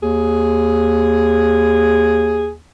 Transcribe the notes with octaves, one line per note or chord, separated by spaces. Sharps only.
D#2 G#4